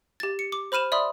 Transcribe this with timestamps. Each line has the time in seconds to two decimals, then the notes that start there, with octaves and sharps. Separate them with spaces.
0.20 G4 A6
0.39 C#7
0.52 D6
0.72 C5 B5 F6 D#7 E7
0.92 D5 E5 B5 C6 D#6